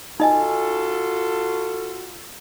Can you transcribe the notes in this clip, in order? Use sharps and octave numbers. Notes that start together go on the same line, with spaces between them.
D#4 F4 F#4 A4 D#5 G#5